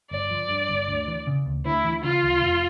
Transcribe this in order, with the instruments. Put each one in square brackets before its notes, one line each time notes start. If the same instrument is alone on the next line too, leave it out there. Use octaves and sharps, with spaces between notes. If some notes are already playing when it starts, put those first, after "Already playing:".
[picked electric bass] G1 [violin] D5
[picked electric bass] F3
G2
G1
D2
E3
C#3
D2
[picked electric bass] D2 [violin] E4
[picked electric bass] E3
[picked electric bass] C#3 [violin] F4
[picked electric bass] D2
F1